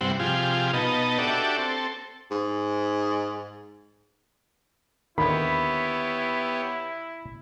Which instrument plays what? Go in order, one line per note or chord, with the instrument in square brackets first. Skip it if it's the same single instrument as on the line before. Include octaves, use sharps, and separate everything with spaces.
[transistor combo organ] G2 C3 G3 C4 E4 F#5
C3 F3 F4 G4 G#4
B2 B3 D#4 D#5 A5
D4 F#4 G4 A4 D5 E5
C4 A4
[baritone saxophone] G#2
[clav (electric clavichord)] D#2 D3 D#3 [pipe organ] B3 G4 C#5 [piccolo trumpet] E4 [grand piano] B5